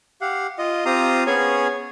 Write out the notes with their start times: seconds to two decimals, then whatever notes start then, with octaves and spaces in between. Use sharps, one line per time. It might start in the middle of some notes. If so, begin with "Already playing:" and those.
0.21 G4 F5 F#5
0.59 F4 D#5
0.86 C4 F4 G4 F5 A#5 D#6
1.27 B3 C#4 G#4 C#5 G#5